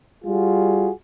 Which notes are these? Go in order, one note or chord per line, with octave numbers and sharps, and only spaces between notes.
G3 F4 F#4 G#4